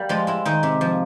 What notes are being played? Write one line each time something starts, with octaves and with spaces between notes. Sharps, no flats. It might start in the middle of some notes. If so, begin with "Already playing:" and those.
Already playing: G3 A#3
F3 G#3 F4
G#3 E4
D#3 D#4
C3
F3